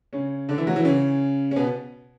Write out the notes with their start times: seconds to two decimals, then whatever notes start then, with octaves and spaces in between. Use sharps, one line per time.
0.13 C#3 C#4
0.49 D3 D4
0.58 E3 E4
0.67 F#3 F#4
0.76 E3 E4
0.85 C#3 C#4
1.51 C#4
1.56 B2 B3